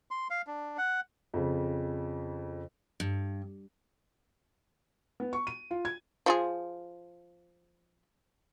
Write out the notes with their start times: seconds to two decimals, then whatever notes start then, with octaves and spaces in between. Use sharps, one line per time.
0.11 C6
0.30 F5
0.47 D4
0.78 F#5
1.34 F2 C#3
3.00 G2
5.20 B3
5.33 C#6
5.47 D#7
5.71 F4
5.85 G#6
6.26 F3 F4 G#4